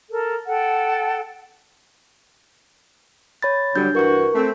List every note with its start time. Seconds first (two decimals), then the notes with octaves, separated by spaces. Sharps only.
0.10 A4 A#4
0.46 A4 F#5 G5
3.42 C#5 B5 A6
3.76 D3 F#3 G3 D4 G6
3.95 G2 E3 F#4 A#4 C#6
4.35 A3 C4